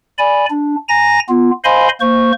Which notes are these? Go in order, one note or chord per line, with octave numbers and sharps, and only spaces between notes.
D5 G#5 B5
D4
G#5 A#5 A#6
B3 F4
C5 D#5 F5 G#5 B5 C6
A#3 C5 C#6